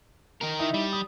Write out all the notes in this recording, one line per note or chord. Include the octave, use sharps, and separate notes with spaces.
D#3 A#4
D#4 E4
G3
D#6